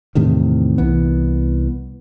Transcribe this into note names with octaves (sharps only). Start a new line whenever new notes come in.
E2 A2 C3 D#3
C2 E3 B3